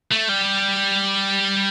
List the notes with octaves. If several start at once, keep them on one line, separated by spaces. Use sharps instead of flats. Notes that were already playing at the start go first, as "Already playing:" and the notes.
A3
G3